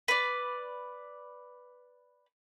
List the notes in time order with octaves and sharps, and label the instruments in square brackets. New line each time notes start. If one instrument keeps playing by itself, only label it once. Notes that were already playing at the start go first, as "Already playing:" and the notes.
[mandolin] B4 D5